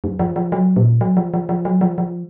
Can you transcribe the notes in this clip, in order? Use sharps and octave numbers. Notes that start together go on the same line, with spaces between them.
F#2
F3
F3
F#3
A#2
F#3
F3
F3
F3
F#3
F3
F3